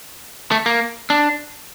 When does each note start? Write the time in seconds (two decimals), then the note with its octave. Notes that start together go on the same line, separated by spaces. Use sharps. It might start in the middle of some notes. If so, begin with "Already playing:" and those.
0.52 A3
0.66 A#3
1.10 D4